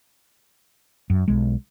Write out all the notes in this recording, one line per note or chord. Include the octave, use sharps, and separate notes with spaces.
F#2
B1 G#3